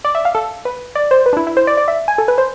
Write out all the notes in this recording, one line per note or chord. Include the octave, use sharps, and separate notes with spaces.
D5
E5
F5
A4
B4
D5
C5
B4
D4
E4
E4
C5
D5
D5
E5
G#5
A4
B4
C5